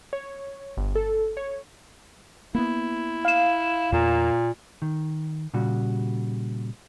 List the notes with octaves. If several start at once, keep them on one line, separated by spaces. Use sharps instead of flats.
C#5
G1
A4
C#5
A#3 B3 E4
F5 E7
E2 A#2 A#3
D#3
A#2 C#3 G3 F#4